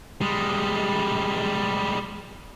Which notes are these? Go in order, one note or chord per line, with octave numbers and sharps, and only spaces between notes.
G3 G#3